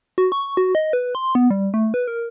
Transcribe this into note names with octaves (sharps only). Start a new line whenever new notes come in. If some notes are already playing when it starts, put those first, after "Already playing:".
F#4
C#6
F#4
D#5
B4
C6
B3
G3
A3
B4
A#4